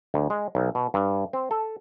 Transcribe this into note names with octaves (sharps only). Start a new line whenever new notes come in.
D2
G#3
B1
B2
G2
C4
A4